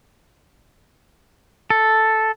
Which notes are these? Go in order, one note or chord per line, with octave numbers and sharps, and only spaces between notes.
A4